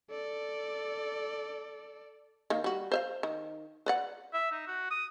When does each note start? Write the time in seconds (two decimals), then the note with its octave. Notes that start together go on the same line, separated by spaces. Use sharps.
0.10 A4 D5
2.50 D#3 A#3
2.64 G3 F#4
2.92 C5 E5 F5
3.23 D#3
3.86 B4 D5 F#5
4.34 E5
4.52 D#4
4.67 F#4
4.91 D#6